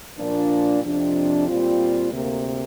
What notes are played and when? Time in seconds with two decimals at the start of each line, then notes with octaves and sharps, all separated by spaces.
0.17 A#2 F3 A#3 D4
0.83 F2 C3 F3 D4
1.48 A#2 G3 C4 F4
2.12 D2 C3 A#3